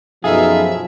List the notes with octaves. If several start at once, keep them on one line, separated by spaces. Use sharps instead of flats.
F#2 B2 F3 D#4 G#4 A4 E5 F5